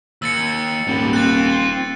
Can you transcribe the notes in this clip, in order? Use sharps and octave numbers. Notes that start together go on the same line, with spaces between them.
D#2 E6 A6 C#7
D#1 G#2 G3
C4 F4 F#6 A6